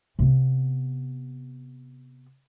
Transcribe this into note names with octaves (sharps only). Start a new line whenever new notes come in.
C3 B3